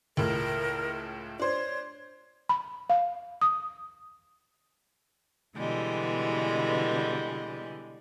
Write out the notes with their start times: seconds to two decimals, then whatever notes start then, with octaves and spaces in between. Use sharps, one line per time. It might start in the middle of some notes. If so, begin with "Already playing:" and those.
0.17 C#2 A2 A#4
1.39 D4 C5 C#5
2.49 B5
2.90 F5
3.41 D#6
5.56 B2 D3 E3 G3 G#3